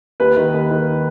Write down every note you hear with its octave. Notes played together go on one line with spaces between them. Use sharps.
D#2 B4
D#3
D#2
D#3